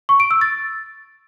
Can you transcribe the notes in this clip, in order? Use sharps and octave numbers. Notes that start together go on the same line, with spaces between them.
C#6
D7
E6
A6